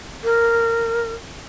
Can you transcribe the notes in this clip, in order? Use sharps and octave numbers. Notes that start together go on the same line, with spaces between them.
A#4